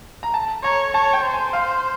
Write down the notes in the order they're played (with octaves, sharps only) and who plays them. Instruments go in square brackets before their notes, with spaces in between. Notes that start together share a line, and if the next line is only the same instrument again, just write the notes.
[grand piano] A#5
A5
[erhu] C#5 [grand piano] A#5
[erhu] C#5 [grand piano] A5
[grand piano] G5
[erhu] C5
[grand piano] G#5
F5